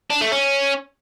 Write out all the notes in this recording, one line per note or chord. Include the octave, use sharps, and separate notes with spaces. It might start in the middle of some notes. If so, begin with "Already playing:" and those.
D4
A3
C#4